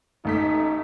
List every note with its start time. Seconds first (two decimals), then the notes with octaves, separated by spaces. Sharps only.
0.25 A1 A3 D#4 B6